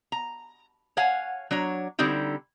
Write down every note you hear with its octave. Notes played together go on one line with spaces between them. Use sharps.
A#5
C#5 F5 F#5 G#5
F#3 D4 C#5 A#5
D3 G3 C4 D#4 E4